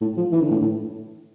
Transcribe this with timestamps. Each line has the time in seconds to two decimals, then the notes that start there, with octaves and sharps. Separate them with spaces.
0.01 A2
0.17 F3
0.32 E3
0.42 D3
0.51 A2
0.62 A2